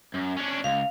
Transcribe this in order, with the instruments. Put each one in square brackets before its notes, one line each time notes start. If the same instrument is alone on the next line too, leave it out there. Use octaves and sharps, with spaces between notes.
[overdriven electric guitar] F#2
C#4 D4
[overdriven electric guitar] C#2 [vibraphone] F5